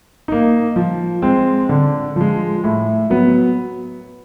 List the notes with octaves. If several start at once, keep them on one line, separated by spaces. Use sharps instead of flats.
A#3 D#4
F3
G#3 C4
D3
F3 G#3
A2
F#3 B3